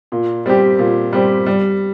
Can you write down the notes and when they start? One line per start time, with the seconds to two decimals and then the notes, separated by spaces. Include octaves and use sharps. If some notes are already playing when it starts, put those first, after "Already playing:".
0.12 A#2
0.46 G3 C4 G4
0.79 A#2
1.13 G3 C4 G4
1.46 G3